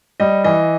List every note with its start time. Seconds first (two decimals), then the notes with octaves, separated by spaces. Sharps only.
0.20 G3 D#5
0.44 E3 D#5